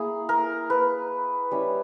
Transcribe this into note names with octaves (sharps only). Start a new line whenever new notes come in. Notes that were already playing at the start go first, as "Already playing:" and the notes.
Already playing: A#3 E4 G#4
A#4
B4
G3 C#4 E4